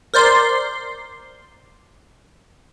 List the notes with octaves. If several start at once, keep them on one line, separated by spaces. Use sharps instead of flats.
A#4 C5 D5 C6